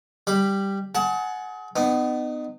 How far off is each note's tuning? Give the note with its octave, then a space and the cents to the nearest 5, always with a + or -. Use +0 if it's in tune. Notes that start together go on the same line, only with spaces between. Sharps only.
G3 +0 B5 +0
G#4 +30 F#5 +0 A5 +10
B3 +25 D#4 -30